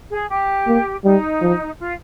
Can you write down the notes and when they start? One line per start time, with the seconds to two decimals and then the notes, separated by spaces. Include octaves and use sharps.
0.10 G#4
0.29 G4
0.67 A#3
1.04 G3 D#4
1.41 F3
1.79 F4